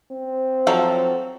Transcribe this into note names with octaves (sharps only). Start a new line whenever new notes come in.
C4
F3 F#3 A4